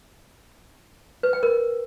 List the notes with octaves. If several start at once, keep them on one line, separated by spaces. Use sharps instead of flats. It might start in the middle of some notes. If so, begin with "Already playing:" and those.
B4
G5
A#4